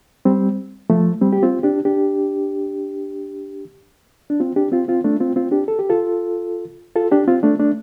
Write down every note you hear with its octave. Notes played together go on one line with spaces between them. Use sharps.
G3 C4
F3 A3
G3 C4
G4
C4 F4
D4 G4
D4 G4
D4
C4 F4
D4 G4
C4 F4
C4 F4
A3 D4
C4 F4
C4 F4
D4 G4
A4
G4
F4 A4
F4 A4
D4 G4
C4 F4
A3 D4
A3 D4